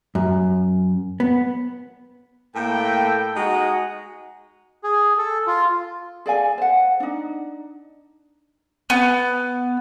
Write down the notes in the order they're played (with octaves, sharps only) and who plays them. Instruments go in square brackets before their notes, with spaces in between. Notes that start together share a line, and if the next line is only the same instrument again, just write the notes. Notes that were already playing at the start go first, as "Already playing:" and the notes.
[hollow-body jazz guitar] F#2
B3
[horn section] A2 A#3 A4 G5
G#3 D#4 F#4 D#5 F#5 A#5
[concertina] G#4
A4
F4
[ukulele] G#4 D5 F5 G#5
C5 F#5
D4 D#4
[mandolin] B3